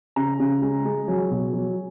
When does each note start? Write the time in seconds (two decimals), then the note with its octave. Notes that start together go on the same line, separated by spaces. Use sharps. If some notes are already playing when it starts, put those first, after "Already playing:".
0.16 C#3 A#5
0.40 C#3
0.62 G#3
0.85 G#3
1.08 F#3 G#5
1.31 B2
1.53 F#3